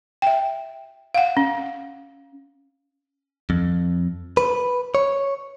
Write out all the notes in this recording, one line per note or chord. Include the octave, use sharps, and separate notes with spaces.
E5 G5
F5 F#5
C#4
F2
B4
C#5